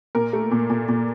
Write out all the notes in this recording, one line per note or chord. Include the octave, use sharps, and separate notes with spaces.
A#2 A#4
A3
A#2
A#2
A#2